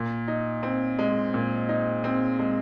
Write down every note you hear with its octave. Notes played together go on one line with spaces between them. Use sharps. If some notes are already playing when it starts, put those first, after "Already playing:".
Already playing: A#2
D#4
C4
G#3
A#2
D#4
C4
G#3